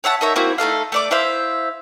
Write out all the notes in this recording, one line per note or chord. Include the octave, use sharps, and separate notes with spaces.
C#5 E5 F#5 A5
D#4 A#4 C#5 E5
A#3 C4 E4 F#4
A3 D#4 A4 F5
A3 D5 D6
E4 C5 E5 F5